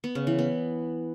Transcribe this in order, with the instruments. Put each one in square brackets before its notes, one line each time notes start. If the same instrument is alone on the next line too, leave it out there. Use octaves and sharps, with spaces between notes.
[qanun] B3
C#3
E3
B3